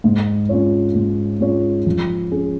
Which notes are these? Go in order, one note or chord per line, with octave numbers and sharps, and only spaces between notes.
G#2
G#3 C#4 F4 C#5
G#2
G#3 C#4 F4 C#5
F3
C#4 G#4